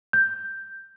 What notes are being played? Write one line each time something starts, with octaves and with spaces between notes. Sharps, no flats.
G6